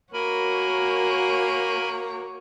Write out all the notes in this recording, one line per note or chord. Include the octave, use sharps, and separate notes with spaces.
A#3 F#4 A#4 C#5 G#5 B5